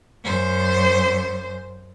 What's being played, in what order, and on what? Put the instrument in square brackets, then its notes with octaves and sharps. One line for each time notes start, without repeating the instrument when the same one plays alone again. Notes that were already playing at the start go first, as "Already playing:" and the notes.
[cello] F#2 C5